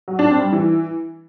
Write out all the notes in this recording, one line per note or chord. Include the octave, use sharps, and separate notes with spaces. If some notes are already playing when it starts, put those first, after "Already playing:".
F#3
D4
C4
G3
E3